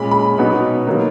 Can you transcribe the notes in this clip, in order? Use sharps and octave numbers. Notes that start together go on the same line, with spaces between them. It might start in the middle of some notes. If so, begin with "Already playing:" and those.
Already playing: A#2 G#3 C#4 B5
B5
B2 F#3 B3 D#4
D#3 F#3 A#3